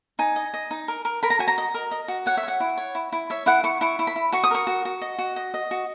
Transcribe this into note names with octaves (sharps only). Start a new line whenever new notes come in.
D#4 G#5
D#5
D#5
D#4
A#4
A#4
A#4 B5
A#5
F#4 G#5
A#5
D#5
A#4
D#5
F#4
C#5 F#5
E5
C#5
F#5
E4
C#5
E4
E4
C#5 E5
E4 F#5
E4 C#6
E4 C#6
E4
B5
E4
F#4 C#6
D#6
A#4 C#6
F#4
F#4
D#5
F#4
D#5
D#5
F#4